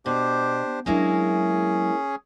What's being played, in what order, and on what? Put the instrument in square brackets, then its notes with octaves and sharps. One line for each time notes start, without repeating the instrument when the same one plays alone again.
[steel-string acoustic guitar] B2 [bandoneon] D4 G4 C5
[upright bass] F#3 D4 [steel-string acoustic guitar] G#3 A#3 E4 [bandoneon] C#4 G#4